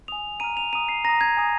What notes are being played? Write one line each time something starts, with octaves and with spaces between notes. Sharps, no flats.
G#5 D#6 F7
A#5 F6 D#7
F7
A#5 D#6 D#7
C7
A#5 D#6 A#6
G#6
G#5 D#6